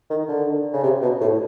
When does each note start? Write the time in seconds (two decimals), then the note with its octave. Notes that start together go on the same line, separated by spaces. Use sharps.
0.10 D#3
0.28 D3
0.73 C#3
0.83 C3
1.02 B2
1.21 A2